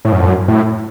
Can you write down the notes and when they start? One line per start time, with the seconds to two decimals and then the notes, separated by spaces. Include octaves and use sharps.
0.05 A2
0.12 F#2
0.19 F2
0.27 F#2
0.48 A2